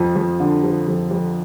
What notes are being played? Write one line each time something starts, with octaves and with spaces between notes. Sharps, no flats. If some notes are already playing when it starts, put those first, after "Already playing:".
Already playing: F2 F3
F2
D3
F3
F2
F2